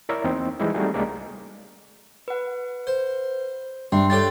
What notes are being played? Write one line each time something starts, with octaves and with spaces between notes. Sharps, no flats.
E4 A#4 C#5 D5 E5
E2 A#3 C4 D#4
E3 G3 G#3 D#4 E4
G3 A3 C4 D#4 F#4 G#4
C2 G#3 A#3 C#4 D5 A#5
B4 F#5
C5
G2 D4 E5 G5 C6
D4 G4 A4 C#5 A6